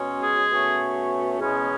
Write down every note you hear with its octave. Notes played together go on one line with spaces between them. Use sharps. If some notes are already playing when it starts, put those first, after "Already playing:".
Already playing: B2 G#3 C#4
G#4
B2 A3 C#4
E2 B2 G#3 C#4